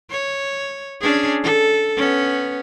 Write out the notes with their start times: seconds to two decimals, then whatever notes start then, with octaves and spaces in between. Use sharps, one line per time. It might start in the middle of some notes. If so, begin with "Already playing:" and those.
0.11 C#5
1.01 C#4 D4 G#4
1.43 A4
1.97 B3 C#4